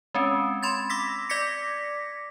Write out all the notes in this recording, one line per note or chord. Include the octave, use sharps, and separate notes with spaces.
G#3 C4 C#4
B5 C6 G#6 A6
D6 E6 A#6 B6
D5 D6 G#6 A#6 B6 C#7